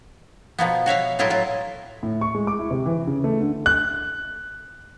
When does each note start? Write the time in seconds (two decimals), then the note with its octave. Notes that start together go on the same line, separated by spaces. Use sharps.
0.59 B2 F3 A#3 B3
0.86 F#4 C#5 E5 F5
1.19 A2 F#3 E4 F4 D#5
1.30 F#3 F4
2.03 A2
2.21 C#6
2.35 G#3
2.47 D6
2.59 E4
2.71 C3
2.86 E3
3.07 C#3
3.24 A3
3.41 D3
3.66 F#6